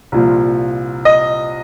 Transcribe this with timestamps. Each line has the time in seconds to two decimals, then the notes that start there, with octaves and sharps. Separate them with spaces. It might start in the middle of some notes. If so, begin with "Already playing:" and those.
0.12 C2 A#2 F3
1.05 D#5